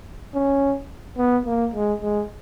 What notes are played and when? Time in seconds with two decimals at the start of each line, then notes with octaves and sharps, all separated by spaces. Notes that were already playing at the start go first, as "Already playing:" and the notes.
0.35 C#4
1.18 B3
1.46 A#3
1.74 G#3
2.02 G#3